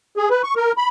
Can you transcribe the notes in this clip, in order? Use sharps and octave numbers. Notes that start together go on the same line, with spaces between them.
G#4
B4
C#6
A#4
B5